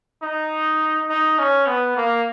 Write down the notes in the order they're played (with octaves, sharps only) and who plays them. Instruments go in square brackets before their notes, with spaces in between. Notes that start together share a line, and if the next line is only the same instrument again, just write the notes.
[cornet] D#4
D#4
C#4
B3
A#3